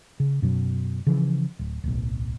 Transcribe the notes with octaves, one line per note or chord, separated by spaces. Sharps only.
C#3
F#2 B2 F#3
C#3 E3 F3
D1
D1 B1